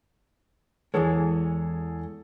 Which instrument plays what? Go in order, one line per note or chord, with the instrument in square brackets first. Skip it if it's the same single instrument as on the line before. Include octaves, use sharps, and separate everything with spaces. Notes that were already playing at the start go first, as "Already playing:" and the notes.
[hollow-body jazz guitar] E2 E3 G#3 [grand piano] G#4 A4 C#5